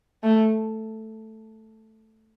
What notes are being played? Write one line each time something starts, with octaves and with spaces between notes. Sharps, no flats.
A3